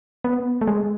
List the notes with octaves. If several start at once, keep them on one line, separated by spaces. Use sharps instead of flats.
B3
A3
G#3